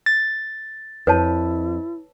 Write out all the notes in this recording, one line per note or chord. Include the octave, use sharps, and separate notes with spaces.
A6
F2 E4 B4 C#5 A5